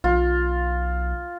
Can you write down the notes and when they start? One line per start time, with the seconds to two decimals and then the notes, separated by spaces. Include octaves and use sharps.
0.04 B1 F4